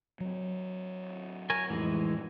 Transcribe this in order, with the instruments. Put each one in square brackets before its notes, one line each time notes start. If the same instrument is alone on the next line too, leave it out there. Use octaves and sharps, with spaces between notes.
[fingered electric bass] F#3 C4
[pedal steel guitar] A#4 C#5 G#5
[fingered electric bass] F2 A2 [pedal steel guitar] E3 G#3